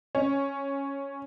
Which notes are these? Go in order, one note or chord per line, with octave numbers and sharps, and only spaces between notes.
C#4